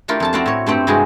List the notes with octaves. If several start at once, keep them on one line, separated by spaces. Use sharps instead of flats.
A3 D4 E4 F4 G4 A#4
F2 A4 A5
C4 E4 F#4 D5 F5 A5
A2 C#5
G2 A3 C4 G4
G2 C3 G#3 E4 F#4 G#4